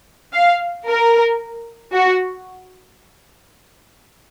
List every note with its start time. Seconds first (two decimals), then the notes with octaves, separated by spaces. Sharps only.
0.33 F5
0.88 A#4
1.93 F#4